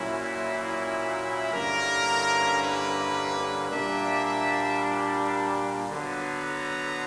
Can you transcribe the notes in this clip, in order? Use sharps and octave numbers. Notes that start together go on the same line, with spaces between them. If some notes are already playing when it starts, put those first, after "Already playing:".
Already playing: A#2 F#3 C#4 E4
G2 D3 A#3 C#4 E4 A#4
B4
A#2 G3 A#3 D4 E5
E5
D3 F#3 B3
A#5